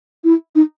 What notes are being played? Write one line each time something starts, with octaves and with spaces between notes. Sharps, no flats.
E4
D#4